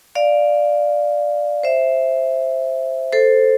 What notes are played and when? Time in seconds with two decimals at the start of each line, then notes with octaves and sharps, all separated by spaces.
0.15 D5 F5
1.63 C5 E5
3.12 A4 C5